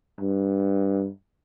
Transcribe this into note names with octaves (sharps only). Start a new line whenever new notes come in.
G2